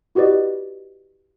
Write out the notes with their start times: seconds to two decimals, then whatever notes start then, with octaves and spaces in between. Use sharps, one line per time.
0.15 E4 F#4 G4 B4 D5 D#5